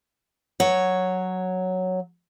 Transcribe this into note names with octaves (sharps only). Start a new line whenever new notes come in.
F#3 C#5